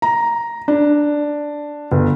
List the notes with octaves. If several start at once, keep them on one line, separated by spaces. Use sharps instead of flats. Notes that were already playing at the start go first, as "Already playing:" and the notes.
A#5
D4
G1